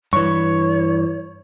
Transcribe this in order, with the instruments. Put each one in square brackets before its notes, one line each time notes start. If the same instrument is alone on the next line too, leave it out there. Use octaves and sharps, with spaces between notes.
[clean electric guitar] G2 E3 [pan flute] C#5 [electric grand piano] C#6